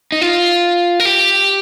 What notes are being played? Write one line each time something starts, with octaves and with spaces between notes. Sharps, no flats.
D#4
F4
A#4
G4